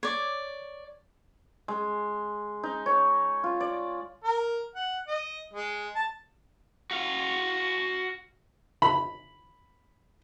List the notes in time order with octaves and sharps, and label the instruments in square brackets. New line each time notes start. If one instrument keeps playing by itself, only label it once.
[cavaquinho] C#5 D5
[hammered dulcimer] G#3
D#4
C#5
F4
D5
[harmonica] A#4
F#5
D#5
G#3
A5
[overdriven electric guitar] F#4 F5
[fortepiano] B5